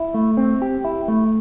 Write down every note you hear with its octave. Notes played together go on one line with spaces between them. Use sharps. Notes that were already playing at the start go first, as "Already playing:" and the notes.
Already playing: E4
A3
C4
G4
E4
A3